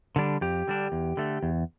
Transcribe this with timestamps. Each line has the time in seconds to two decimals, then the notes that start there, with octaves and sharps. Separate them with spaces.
0.16 D3 G3 D4
0.41 F2 G4
0.67 D3 G3 D4
0.92 E2
1.17 D3 A3
1.43 E2